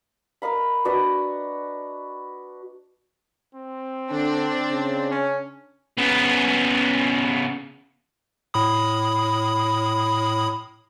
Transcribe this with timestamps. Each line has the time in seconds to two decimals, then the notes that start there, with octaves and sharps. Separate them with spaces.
0.42 A#4 D#5 F5 B5
0.85 D4 F#4 B4 D#5
3.55 C4
4.11 D3 D4
4.71 C#3
5.11 C#4
5.97 C#3 B3
8.54 A2 B5 D#6